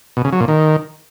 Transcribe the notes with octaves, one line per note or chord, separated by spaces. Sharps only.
B2
C#3
F#3
A#2
D#3